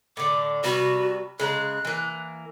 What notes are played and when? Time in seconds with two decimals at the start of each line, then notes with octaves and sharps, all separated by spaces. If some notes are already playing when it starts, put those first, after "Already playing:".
0.17 A2 D3 D6
0.64 C3 G3 F#4 B4
1.40 C#3 G#3 A#5 F#6
1.85 E3 A#3